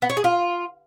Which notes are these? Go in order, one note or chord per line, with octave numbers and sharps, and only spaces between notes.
B3
C#5
G#4
F4